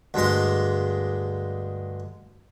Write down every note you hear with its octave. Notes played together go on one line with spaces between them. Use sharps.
D2 G2 G#3 C6